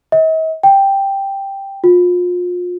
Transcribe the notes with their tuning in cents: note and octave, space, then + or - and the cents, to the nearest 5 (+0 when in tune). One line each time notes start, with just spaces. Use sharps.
D#5 +45
G5 +5
F4 +35